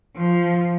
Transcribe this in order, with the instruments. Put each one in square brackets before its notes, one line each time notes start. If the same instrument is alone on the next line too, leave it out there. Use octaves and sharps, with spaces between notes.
[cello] F3